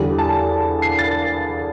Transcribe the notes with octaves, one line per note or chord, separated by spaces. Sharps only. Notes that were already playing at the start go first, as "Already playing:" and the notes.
Already playing: E2 D3 G3
A5
C7
A6